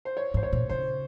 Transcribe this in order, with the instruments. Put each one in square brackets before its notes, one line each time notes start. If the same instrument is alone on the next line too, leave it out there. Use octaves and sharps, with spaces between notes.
[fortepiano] C5
C#5
[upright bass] G#2 [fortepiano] C5
[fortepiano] C#5
[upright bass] A#2
[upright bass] C#3 [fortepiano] C5